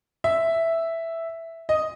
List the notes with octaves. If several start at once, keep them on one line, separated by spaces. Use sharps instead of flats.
E5
D#5